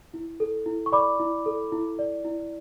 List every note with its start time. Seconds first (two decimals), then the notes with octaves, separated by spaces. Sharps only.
0.14 E4
0.40 A4
0.66 E4
0.86 C#6
0.92 D5 B5 D6
1.20 E4
1.46 A4
1.72 E4
1.99 D5
2.25 E4